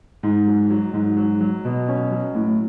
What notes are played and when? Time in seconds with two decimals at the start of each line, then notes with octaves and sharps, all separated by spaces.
0.23 G#2
0.47 F#3
0.70 F#3
0.93 G#2
1.17 F#3
1.41 F#3
1.65 B2
1.88 C#4
2.11 F#3
2.35 A2